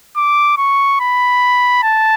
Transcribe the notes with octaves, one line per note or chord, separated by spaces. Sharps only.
D6
C#6
B5
A5